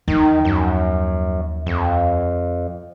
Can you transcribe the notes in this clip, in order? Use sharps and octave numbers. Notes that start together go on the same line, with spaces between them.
D#2 D#3 F3
F#2
F2